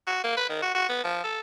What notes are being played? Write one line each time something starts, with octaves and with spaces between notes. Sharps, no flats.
F#4
A#3
B4
D#3
F#4
F#4
B3
F3
A4